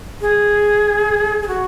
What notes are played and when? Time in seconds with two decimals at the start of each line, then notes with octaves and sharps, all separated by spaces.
0.21 G#4
1.42 G#4
1.48 F#4